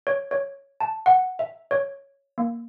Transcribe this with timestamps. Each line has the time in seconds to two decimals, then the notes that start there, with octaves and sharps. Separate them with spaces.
0.07 C#5
0.31 C#5
0.80 A5
1.06 F#5
1.39 E5
1.71 C#5
2.38 A#3